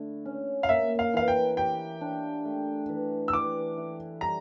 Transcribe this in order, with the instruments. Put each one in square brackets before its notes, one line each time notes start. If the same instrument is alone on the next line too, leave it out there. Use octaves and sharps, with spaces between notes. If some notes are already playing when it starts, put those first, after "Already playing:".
Already playing: [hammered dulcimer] D3 A3 E4
C#4
[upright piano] F5
[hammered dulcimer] A#3 [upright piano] E5
[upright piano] F5
[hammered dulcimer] E3 [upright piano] F5
[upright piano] G5
[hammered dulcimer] G4 [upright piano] G5
[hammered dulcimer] D4
A3
E3
[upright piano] E6
[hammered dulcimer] E3 [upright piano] D6
[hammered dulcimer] E4
[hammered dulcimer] G3 [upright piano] A#5